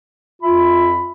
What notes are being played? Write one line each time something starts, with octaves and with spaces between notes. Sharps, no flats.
F2 F4 E5 B5